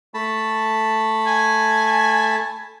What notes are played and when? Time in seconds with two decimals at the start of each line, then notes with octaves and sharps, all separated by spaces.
0.14 A3 A5 B5
1.26 G#5